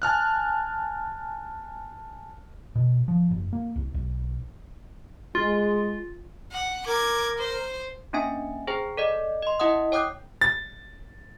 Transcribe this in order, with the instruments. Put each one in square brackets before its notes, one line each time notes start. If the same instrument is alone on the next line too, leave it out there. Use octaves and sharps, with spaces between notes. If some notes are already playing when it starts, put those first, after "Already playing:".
[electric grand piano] G#5 A5 F6 F#6
[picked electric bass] B2
F3
F#1
A#3
C2
B1
[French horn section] G#3 [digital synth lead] F4
[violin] F#5
[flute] A#4 [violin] D6 G#6
[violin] C5
[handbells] A#3 C#4 D4 E5 G#5
G#4 C5 G5 A#5
A4 D5 D#5
D#5 C6
E4 D#5 E5 F#5 D#6
C#5 G5 D6 D#6 F#6 G6
[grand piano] A6